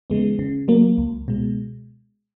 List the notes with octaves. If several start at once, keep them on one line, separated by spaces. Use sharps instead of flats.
C#3 E3 G#3 B3
C#3
F#3 A#3
C#2
B2 G#3